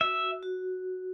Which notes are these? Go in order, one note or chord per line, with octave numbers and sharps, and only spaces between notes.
F#4 E5
F#4
F#4